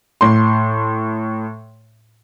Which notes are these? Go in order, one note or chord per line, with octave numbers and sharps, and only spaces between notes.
A2 C6